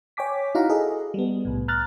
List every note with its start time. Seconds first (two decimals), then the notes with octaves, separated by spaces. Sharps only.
0.17 C#5 G5 G#5 D6 B6
0.55 D#4 E4 F#4 F5 F#5 A#5
0.69 G#4 A4 D#5
1.14 G3 B3
1.45 C2 A2
1.68 A#5 F6 F#6 A6